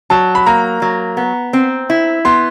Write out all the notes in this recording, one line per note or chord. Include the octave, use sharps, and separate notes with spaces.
F#3 A5
B5
A#3 A#5
F#3
B3
C4
E4
B3 C6